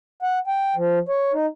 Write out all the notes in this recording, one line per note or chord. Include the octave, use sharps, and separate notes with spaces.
F#5
G5
F3
C#5
D#4